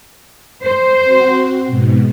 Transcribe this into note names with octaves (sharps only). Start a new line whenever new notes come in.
C5
C4 F#4
G#2 B2